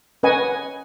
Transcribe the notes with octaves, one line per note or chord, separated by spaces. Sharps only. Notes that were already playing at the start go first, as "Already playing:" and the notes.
C#4 B4 D#5 F#5 G#5